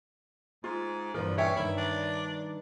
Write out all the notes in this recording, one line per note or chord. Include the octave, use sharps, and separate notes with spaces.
G#2 F4
G2 A#2 E3 F3 A#4
C#4 C#5 E5 G5
G2 D#3 E4
D4